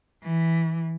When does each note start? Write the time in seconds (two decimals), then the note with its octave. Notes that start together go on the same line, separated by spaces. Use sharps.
0.24 E3